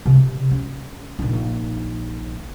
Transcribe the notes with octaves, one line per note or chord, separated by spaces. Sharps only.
C3
C#4
A#1 D#4